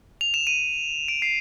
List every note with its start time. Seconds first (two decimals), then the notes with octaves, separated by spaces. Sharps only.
0.21 F7
0.34 E7
0.47 D#7
1.08 D7
1.22 C7